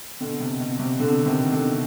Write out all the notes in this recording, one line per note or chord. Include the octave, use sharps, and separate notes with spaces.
B2 D3
C3
B2
C3
B2 D3
C3 D#3
B2 D3